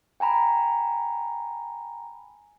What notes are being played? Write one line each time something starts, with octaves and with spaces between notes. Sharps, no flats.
G5 G#5 A#5 B5